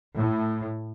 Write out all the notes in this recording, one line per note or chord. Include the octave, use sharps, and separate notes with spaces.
A2